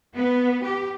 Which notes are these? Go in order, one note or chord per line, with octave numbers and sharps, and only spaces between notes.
B3
G4